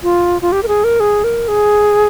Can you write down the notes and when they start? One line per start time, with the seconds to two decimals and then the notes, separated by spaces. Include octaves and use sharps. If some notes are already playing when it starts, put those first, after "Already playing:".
0.03 F4
0.42 F4
0.52 G4
0.63 A#4
0.68 G#4
0.84 A#4
1.00 G#4
1.24 A#4
1.48 G#4